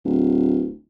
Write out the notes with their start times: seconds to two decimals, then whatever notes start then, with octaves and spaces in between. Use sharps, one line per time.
0.05 D1